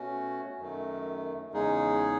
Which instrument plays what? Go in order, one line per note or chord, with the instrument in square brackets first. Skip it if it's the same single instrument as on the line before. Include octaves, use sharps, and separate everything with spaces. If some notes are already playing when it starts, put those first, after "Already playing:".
Already playing: [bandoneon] B2 A3 C#4 F#4
F#2 D#3 A3
E2 C#3 G#3 D#4 G#4